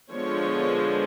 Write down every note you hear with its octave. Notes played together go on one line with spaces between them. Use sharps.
D3 F3 G#3 B3 C#5